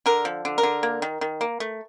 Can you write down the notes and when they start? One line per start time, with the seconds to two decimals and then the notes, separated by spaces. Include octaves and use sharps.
0.06 D3 A#4
0.25 F3
0.45 D3
0.58 A#4
0.63 D3
0.83 A#3
1.02 D#3
1.21 D#3
1.41 A#3
1.60 A3